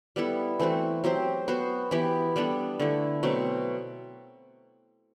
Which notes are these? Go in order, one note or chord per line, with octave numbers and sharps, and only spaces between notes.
G3 B3 E4 A4
E3 A3 C4 F#4
F#3 C4 G4 C5
B3 F#4 C5
E3 B3 E4 G4
G3 B3 D4 A4
D3 A3 E4
B2 F#3 A3 C4